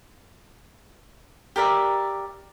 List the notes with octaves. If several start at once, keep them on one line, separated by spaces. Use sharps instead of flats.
G4 A#4 D5 E5